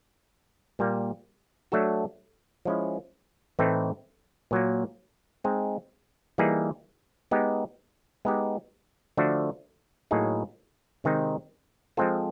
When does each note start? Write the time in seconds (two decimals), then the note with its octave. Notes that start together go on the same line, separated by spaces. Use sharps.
0.79 A#2 G3 A#3
1.72 F#3 A3 D4 F#4 A4
2.65 F3 G#3 C#4 E4
3.59 A2 E3 A3 C4 D#4
4.51 A#2 F#3 A#3
5.44 G#3 C4 D#4 G#4
6.38 E3 G3 A#3 D#4 G#4
7.31 G#3 B3 D#4 G4
8.25 G#3 B3 D#4 G4
9.17 D3 F3 A3 D4 F#4
10.11 A2 F#3 A#3 D#4 G#4
11.04 C3 D#3 G#3 C4 D#4
11.97 F3 G#3 C4 F4 A4